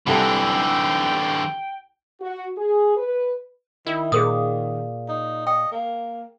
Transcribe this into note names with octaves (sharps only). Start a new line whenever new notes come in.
C2 D3 E3 A4 G5
F#4
G#4
B4
D#3 E4
A#2 G#4 A#4 D#6
D#4
D#5 G5
A#3